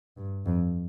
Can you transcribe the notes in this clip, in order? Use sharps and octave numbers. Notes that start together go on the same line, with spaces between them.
G2
F2